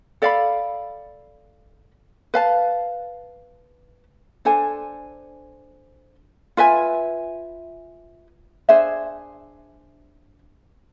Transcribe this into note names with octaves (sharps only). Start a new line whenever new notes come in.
A4 D5 F5 B5
B4 F5 A5
D4 A4 C5 G#5
F4 B4 E5 G#5
D4 G#4 C5 E5